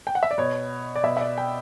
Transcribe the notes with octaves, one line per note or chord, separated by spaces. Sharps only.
G5
F#5
E5
D5
B2 C#5
D5
B2 E5
E5
D5
G5